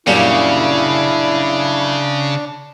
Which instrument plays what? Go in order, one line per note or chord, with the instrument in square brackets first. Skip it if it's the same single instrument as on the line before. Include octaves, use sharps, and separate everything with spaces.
[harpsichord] F#2 A#2 G3 [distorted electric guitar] C#3 [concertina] D4 [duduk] E4